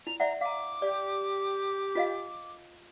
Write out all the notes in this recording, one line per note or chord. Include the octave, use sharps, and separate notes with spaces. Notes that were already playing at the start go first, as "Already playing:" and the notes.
E4 F7
D5 E5 F#5 A#5
F5 A#5 D6
G4 D5
F4 D#5 F5